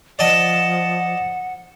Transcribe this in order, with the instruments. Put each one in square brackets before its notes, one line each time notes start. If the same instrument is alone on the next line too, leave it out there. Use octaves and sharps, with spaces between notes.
[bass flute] F3 [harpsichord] D5 D#5 A5 [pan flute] F#5